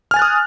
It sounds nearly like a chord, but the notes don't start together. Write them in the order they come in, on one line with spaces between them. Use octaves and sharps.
F6 G#5 A6 F#6 D#6